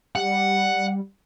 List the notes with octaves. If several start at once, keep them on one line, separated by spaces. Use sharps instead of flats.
G3 F#5